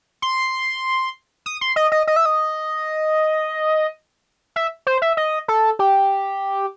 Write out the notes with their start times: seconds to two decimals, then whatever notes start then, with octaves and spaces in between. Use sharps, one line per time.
0.22 C6
1.46 D#6
1.61 C6
1.76 D#5
1.92 D#5
2.07 D#5
2.16 E5
2.26 D#5
4.56 E5
4.87 C5
5.02 E5
5.17 D#5
5.48 A4
5.79 G4